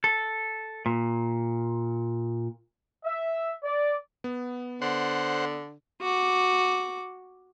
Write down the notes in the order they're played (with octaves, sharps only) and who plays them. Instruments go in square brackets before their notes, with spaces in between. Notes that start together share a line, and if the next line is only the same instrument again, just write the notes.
[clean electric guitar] A4
A#2
[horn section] E5
D5
[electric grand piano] B3
[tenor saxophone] D3 [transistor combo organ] C5 F#5
[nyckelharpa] F#4 D6